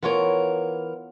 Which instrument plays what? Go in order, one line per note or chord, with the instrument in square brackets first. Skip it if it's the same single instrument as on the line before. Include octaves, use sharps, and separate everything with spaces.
[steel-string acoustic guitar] E3 A#4 [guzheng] B3 F4 C#5